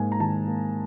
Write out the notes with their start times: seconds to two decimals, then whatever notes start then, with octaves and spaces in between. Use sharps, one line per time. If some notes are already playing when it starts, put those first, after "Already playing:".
Already playing: G#2 A#3 G#5
0.12 A#5
0.20 D#3 A5
0.47 A#3